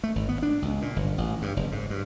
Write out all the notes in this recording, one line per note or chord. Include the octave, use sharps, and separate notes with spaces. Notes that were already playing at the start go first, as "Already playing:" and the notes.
A3
G#1
B3
D4
C#2
A#2
G1
A1
G2
F#1
G#2
G2